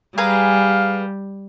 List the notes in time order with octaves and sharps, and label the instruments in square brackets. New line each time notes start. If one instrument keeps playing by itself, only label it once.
[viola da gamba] G3 [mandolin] G#4 B4 A#5 [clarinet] F5